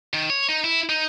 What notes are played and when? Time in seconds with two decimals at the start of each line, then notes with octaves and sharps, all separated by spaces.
0.14 D#3
0.30 C#5
0.49 D#4
0.64 E4
0.89 D#4